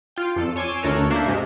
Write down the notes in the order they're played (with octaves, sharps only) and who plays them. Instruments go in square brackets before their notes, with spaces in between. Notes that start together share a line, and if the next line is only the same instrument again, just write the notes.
[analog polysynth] F4 G5
F2 A4
C#5 G#5 C6 D6 E6
D2 A4 A#4 C#5 F#6
A#3 D4 A4 C5 E5
G2 C3 G#3